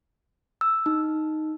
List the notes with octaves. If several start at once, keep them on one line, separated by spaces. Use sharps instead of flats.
E6
D#4